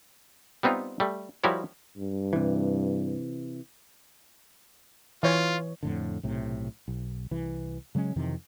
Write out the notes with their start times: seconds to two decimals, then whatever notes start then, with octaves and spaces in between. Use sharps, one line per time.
0.63 G3 B3 C4 D#4 F4
1.00 G3 A3
1.44 F3 G3 E4 F#4 A#4 C#5
1.97 G2
2.33 C3 E3
5.23 E3 F4 C#5
5.83 F2 A2 D3
6.23 B1 A2 C3
6.88 B1
7.31 C2 E3
7.95 C#3 F#3 G#3 C#4
8.16 F2 C3 D#3 E3